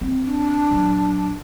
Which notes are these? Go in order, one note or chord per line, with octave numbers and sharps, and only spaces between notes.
C4
D4
A#1 F#3